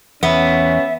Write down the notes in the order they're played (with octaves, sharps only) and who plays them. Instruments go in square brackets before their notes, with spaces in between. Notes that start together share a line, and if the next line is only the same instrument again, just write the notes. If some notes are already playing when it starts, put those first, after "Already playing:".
[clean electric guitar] E2 [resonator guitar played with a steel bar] B3 [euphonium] C#4 [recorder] E5